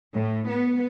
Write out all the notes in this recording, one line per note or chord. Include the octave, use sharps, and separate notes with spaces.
A2
B3